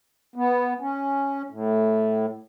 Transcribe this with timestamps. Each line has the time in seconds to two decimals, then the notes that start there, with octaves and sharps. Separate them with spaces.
0.36 B3
0.80 C#4
1.50 A2